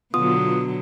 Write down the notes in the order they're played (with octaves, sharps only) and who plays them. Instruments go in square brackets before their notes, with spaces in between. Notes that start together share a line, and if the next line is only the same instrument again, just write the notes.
[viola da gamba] B2 D3 F#3 [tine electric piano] B3 F4 [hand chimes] D#6